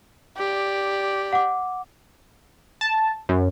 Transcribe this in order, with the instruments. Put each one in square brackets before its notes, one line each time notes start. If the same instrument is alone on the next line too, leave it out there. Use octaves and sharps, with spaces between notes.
[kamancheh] G4 D5
[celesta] F#5 D6
[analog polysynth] A5
F#2